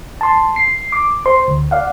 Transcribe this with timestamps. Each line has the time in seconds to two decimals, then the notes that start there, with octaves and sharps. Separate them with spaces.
0.21 A5 C6
0.56 C7
0.92 D6
1.26 C5 C6
1.48 D2
1.71 D5 F5 F#5